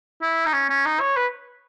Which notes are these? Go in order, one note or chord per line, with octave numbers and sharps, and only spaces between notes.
E4
D#4
C#4
C#4
D#4
C#5
B4